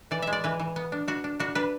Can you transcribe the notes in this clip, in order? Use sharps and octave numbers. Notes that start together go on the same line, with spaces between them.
E3 D5
G#3 E5
D5
E3 B4
E3
B3
D4
D4 F#4
D4
D4 F#4
D4 B4